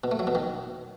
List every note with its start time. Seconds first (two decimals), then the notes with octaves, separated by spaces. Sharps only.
0.04 B2
0.11 A3
0.19 F#3
0.27 B2
0.35 D#3